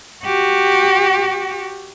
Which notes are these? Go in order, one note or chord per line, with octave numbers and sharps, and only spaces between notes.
F#4 G4